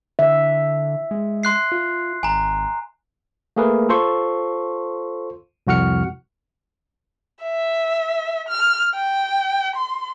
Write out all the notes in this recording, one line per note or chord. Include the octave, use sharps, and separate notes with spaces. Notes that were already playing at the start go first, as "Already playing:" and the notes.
D3 E5
G#3
C6 F#6 C7
F4
G#1 G#5 A#5
A3 A#3 G#4 A#4 B4
F4 A4 C5 C6 C#6
C2 F2 F#4 F#5 F6 C#7
E5
F6
G5
C6